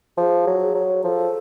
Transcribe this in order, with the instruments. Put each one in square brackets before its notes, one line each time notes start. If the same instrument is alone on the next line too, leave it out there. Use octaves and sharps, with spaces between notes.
[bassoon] F3 [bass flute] G#4
[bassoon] F#3
[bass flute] G#4
[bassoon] F#3
[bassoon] F3 [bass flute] A4